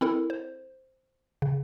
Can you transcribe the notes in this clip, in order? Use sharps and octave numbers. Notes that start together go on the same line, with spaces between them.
C4 E4 A4 A#4
C5
C#3